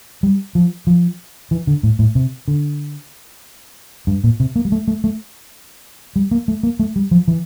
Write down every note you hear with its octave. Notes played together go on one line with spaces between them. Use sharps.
G3
F3
F3
E3
D3
A2
A2
C3
D3
G2
A#2
C3
A#3
G3
A3
A3
A3
G3
A#3
A3
A#3
A3
G3
F3
E3